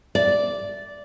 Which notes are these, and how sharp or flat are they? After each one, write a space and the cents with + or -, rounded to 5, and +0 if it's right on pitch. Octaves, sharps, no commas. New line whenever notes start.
D5 -10